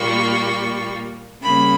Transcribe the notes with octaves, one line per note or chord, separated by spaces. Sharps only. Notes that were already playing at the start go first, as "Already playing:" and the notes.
Already playing: A#2 G3 A#3 C#6
C#3 G3 A#3 B5